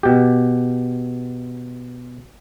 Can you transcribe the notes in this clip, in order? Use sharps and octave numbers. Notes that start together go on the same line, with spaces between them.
B2 G4